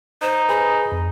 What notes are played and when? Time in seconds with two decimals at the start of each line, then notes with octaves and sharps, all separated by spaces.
0.22 D#4 C5
0.49 G#4 B4 G#5 B5
0.92 F2